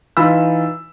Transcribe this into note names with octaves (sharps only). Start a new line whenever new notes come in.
E3 D#4 F4 B5 E6